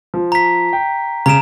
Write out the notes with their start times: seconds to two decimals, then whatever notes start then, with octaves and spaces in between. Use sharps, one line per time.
0.14 F3
0.32 A#5 B6
0.73 G5
1.26 C#3 A#5 D7 E7